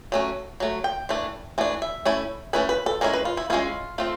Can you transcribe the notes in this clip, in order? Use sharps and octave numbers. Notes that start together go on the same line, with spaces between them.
F#3 A3 C#4
F#3 A3
G5
E3 A3 D4
E3 A3 D4
E5
A3 C#4 E4
A3 C#4 E4 B4
B4
A4
G#3 C#4 E4 A#4
B4
F4
E4
G#3 C#4 E4 F4
A3 C4 F4